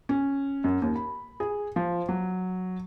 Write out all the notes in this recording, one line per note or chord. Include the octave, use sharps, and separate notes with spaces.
C#4
F#2
D#2
B5
G#4
F3
F#3